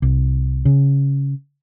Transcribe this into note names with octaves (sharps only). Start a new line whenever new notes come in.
C2
C#3